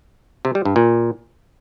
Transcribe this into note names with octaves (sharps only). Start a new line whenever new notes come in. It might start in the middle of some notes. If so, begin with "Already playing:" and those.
C3
G3
G2
A#2